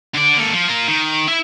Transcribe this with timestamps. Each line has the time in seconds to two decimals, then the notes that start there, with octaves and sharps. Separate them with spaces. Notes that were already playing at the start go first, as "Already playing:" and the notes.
0.15 D3 D5
0.37 A#3 A4
0.54 F3
0.68 F4 A#4
0.88 D#3
1.28 E4 E5